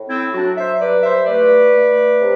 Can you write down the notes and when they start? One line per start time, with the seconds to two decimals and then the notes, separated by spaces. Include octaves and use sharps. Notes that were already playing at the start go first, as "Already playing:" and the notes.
Already playing: A2
0.10 C4 E4
0.34 F#3 D4 F#4
0.56 C5 E5
0.80 G2 B4 D5
1.03 C5 E5
1.26 A3 B4 D5
1.73 A3
2.20 C3